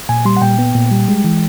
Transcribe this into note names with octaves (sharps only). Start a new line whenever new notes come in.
A#2 G#5
G3 C6
F#5
A#2 G5
B3
A#2
G3
G#3
E3